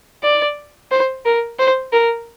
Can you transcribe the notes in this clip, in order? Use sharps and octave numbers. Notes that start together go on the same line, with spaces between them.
D5
C5
A#4
C5
A#4